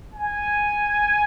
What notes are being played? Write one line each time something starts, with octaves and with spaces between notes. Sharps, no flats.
G#5